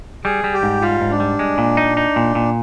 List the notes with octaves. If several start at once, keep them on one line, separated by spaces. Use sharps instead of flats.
G3 G#4
G3
G4
G#2
G3 F4
G#2
D4
G3
G#3
A#2
D#4
D#4
A#2
A#2